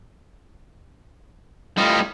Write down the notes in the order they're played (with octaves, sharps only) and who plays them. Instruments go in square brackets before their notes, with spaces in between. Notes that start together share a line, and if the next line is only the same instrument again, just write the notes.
[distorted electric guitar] A2 G3 [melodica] F4 D#5